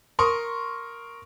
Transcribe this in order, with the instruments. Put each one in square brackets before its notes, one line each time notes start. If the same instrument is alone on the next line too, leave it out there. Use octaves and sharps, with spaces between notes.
[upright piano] A#4 C6 C#6 D#6